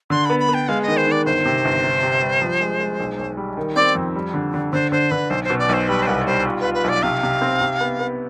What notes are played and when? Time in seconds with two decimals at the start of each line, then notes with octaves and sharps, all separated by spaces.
0.10 D3 C6
0.25 B3 B5
0.40 B5
0.49 B3
0.54 G5
0.68 G#3 F5
0.82 D#5
0.88 D#3
0.97 C5
1.07 D#3 D5
1.26 G1 C5
1.45 C3
1.65 G1
1.84 C3
2.03 C3
2.22 G3
2.42 F3
2.61 G#3
2.80 G#3
3.00 B1
3.19 B1
3.37 G3
3.57 D#3
3.76 C4 D5
3.95 F2
4.15 G3
4.34 D3
4.54 D3
4.72 D3 C5
4.92 D3 C5
5.11 D3 B4
5.30 B1 C5
5.44 C5
5.50 B2
5.59 D5
5.69 B1 C5
5.88 G3 B4
6.03 C5
6.07 C2 B4
6.22 D5
6.26 G3 C5
6.46 F4
6.60 F4 B4
6.74 B4
6.84 B1 D5
7.03 C3 F5
7.23 C3
7.42 C4
7.61 C3
7.80 B3
7.99 B3